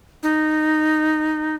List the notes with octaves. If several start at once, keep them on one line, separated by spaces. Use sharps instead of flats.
D#4